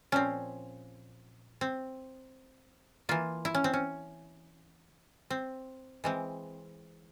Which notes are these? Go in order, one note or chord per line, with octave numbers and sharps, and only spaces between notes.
A#2 F3 C4 C#4
C4
E3 A#3 F4
E4
C#4
C4
C#4
C4
E3 G#3 C4